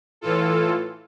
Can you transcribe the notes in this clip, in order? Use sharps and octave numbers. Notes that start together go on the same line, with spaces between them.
A2 E3 F4 A4